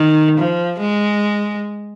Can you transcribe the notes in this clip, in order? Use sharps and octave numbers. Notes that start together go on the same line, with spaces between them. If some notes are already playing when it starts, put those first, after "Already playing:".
Already playing: D#3
F3
G#3